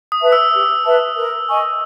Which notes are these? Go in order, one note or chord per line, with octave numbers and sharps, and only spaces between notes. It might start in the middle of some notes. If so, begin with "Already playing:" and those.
D#6
B4 E5 A5
E6
G4
B4 E5 A5
A#4
D#5 G#5 C#6